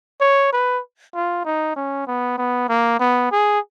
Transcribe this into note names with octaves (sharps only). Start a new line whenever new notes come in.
C#5
B4
F4
D#4
C#4
B3
B3
A#3
B3
G#4